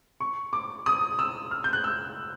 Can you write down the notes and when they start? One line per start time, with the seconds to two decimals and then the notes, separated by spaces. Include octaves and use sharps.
0.20 C#6
0.53 D6
0.86 D#6
1.19 E6
1.51 F6
1.64 G6
1.73 F#6
1.84 E6